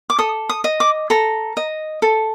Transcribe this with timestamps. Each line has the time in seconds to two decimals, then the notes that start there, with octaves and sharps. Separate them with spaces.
0.10 D6
0.18 A4 D#6
0.49 D#6
0.64 D#5
0.80 D6
1.10 A4 A#5
1.57 D#5
2.02 A4